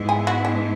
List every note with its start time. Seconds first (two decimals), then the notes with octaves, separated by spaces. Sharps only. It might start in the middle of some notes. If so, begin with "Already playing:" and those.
Already playing: G#2 G#3 B3 E4
0.09 G#4
0.27 F#4
0.45 D4